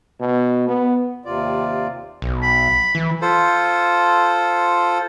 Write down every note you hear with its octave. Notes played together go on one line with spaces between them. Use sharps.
B2
B3
D#2 C3 F4 D5
B1
B5
E3
F4 A4 C5